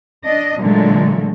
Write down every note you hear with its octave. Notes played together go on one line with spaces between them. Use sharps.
D4 D#5
A#2 D3 E3 F#3 G#3 A3